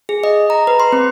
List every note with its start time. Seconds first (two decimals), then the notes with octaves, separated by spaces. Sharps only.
0.09 G#4
0.24 D#5
0.50 A#5
0.67 B4
0.80 C6
0.92 C4